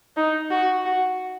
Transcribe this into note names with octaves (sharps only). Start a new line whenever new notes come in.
D#4
F#4
F#4